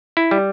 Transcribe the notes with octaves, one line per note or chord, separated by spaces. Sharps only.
E4
G3